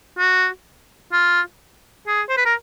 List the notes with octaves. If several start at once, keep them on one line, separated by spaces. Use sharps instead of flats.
F#4
F4
G#4
C5
B4
A#4